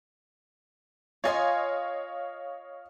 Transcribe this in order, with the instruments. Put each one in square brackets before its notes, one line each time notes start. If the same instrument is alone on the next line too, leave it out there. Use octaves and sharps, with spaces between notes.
[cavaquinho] F4 G#5 C6 [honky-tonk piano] C#5 D#5 F5